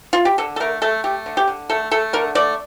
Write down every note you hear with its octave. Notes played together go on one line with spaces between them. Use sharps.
F4
G4
D3 A4
A4
A3 A#4
A3 A4
A3 G4
D3
G4
D3
A3 A4
A3 A4
D3 A#4
A3 D5